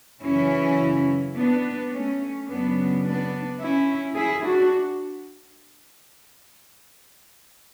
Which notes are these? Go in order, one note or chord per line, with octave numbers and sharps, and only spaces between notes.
F#2 C#3 E3 C#4 E4
B3 D4
A3 C#4
F#2 C#3 F#3 B3 D4
B3 D4
C#4 E4
E4 G#4
D4 F#4